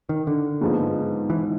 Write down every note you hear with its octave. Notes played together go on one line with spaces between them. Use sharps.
D#3
D3
G#2 F3 G#3 B3 D#4
E3